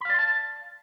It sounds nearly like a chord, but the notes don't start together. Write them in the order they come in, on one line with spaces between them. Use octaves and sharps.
B5 F5 D5 C6 A5